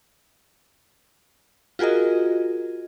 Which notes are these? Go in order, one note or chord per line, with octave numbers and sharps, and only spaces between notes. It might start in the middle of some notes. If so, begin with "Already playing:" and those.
F4 F#4 G#4 A#4 D#5